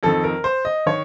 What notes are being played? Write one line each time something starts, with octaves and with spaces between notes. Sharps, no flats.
F2 D#3 A4
A#4
C5
D#5
D#3 C#5